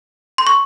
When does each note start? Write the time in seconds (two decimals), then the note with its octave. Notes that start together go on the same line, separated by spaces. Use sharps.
0.38 C6
0.47 C#6